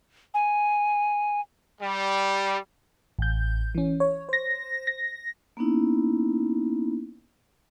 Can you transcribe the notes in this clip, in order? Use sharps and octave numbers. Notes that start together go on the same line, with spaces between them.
G#5
G3
A1 G6
E3 C#4
C#5
C5 A#6
A#6
A#3 B3 C#4 D#4 E4